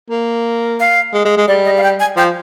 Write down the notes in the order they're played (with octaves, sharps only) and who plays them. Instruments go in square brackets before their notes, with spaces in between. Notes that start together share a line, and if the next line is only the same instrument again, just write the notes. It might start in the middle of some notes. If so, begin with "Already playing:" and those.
[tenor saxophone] A#3
[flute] F5
[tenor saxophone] G#3
G#3
G#3
[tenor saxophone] G3 [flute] D5
[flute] D#5
F5
G5
G#5
[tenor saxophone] F3 [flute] G5